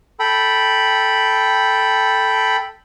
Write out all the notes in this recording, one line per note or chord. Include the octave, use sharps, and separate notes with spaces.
A4 G5 B5